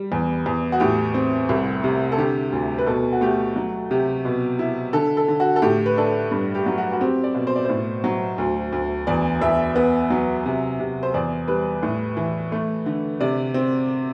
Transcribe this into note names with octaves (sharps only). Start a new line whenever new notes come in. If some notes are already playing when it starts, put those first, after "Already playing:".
Already playing: G3
E2
E2
F#4
A2 G4
C4
C2
C3
A4
D3 G4
D2
B4
B2 A4
F#4
A3 G4
F#3
C3 G4
B2
E4
D3 A4
A4
D3
F#4
A4
A2 G4
B4
D4 A4
G2
G4
F#3
F#4
F#4
C4 G4
D5
B2
C5
D5
A2 C5
F#3
D2
D2
E2 D5
E2 E5
B3
F#3
C3
C3
C5
E2 D5
G3 B4
A2
E3
A3
D3
C3 D5
C4